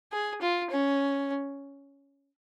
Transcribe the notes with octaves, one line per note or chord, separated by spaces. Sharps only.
G#4
F4
C#4